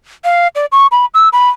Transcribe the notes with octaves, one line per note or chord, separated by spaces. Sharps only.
F5
D5
C#6
B5
E6
B5